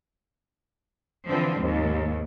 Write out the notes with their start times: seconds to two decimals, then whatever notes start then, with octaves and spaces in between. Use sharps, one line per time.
1.26 D3 E3 F3 C4
1.58 D#2 G#2